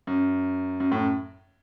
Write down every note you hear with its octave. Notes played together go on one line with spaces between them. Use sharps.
F#2
F#2
F#2 A2